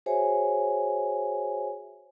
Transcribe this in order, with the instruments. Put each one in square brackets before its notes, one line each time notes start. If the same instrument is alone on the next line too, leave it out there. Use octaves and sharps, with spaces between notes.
[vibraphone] F#4 G#4 C5 C#5 E5 G#5